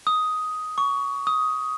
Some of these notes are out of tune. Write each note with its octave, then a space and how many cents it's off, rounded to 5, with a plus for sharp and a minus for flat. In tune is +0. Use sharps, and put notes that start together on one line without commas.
D#6 +5
C#6 +20
D#6 +10